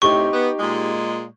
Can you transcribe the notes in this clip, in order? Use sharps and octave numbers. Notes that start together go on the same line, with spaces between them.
A2 C3 D#4 G4 C#6 G7
B3
A#2 G#3